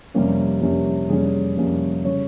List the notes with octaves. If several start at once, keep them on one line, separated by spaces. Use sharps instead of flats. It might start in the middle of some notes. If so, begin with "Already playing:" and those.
F2 C3 G3 A#3 C#4
F2 C3 G3 A#3 C#4
F2 C3 G3 A#3 C#4 G#4
F2 C3 G3 A#3 C#4
C#3 G3 C#4 C#5